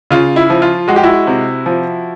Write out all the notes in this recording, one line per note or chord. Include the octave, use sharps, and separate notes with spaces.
C#3 F4
E4
F3
F4
G#3 F#4
G4
E4 F#4
C3
F3